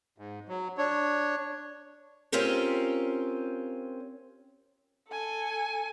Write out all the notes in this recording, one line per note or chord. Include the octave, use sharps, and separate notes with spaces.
G#2
F#3
D4 C#5
C4 C#4 F4 G4 A#4
A4 G#5